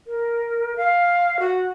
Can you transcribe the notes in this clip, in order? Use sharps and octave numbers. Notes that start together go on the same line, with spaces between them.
A#4
F5
F#4